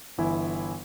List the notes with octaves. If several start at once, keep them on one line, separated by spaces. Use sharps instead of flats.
G1 E3 E4 G#5